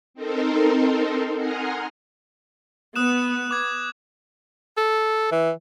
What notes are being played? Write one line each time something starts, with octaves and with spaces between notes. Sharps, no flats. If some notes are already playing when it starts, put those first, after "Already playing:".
C4 D#4 A4 A#4 C5
F#5 G#5 A#5 C6 D#6 F6
B3 D#6 F#6 E7
D6 G#6
A4
E3